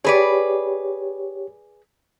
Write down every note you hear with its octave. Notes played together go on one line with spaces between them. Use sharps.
G4 G#4 B4 C#5 D5